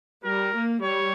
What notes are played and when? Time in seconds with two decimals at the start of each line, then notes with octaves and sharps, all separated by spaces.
0.24 G3 A#4
0.54 A#3
0.82 G3 C#5